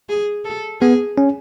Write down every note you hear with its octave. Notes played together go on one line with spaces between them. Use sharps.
G#4
A4
B3 G#4
C#4